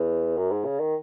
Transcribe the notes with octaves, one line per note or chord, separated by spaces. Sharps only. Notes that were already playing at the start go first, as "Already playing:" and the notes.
Already playing: E2
F#2
G#2
C#3
D#3